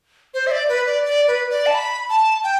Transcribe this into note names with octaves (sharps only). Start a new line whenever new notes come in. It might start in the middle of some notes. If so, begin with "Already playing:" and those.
C5
E5
D5
B4
D5
D5
B4
D5
A5
B5
A5
G5